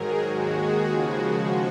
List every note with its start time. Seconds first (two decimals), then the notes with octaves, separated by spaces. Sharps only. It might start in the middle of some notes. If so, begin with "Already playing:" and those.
Already playing: G#2 D#3 F#3 G#4 A#4
0.23 D#2 D#3 G#3 F#4
0.55 G#4
0.88 D#2 C#3 F3 G#3 F#4